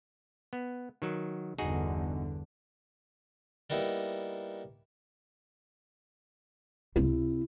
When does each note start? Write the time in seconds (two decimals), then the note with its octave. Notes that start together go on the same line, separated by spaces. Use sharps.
0.53 B3
1.02 D#3 F#3
1.58 G1 E2 D3 D#4 F#4 G#4
3.70 G3 A#3 B3 D#4 E4
6.96 C#2 C3 C4 E4